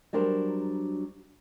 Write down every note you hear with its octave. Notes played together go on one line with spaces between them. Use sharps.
F#3 G3 D4 A#4 C5